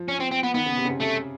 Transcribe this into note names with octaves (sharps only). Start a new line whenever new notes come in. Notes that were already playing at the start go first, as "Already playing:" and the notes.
Already playing: F3
C#4
C4
C4
B3
D#3 B3
C#3
C3
C#3
C3
C3 A3